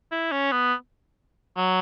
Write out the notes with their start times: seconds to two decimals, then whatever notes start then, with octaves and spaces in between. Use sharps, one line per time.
0.12 E4
0.32 C#4
0.52 B3
1.57 F#3